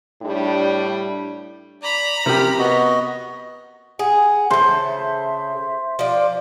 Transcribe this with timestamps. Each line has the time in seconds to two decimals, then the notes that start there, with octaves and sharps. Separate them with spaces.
0.22 A2 G3 D4
1.83 D5 A#5 B5
2.26 C3 G4 A#4
2.59 B3 F#4 D#5
3.99 G#4 F#5
4.51 C#3 A4 C5 E5
5.99 F3 D5 F5